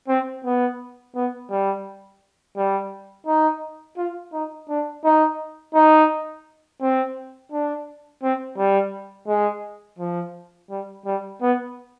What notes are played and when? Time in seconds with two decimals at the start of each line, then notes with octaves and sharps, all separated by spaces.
0.08 C4
0.45 B3
1.15 B3
1.51 G3
2.57 G3
3.27 D#4
3.97 F4
4.33 D#4
4.69 D4
5.05 D#4
5.74 D#4
6.82 C4
7.52 D4
8.23 C4
8.58 G3
9.28 G#3
9.99 F3
10.70 G3
11.06 G3
11.42 B3